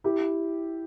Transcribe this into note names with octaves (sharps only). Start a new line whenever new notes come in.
E4 G4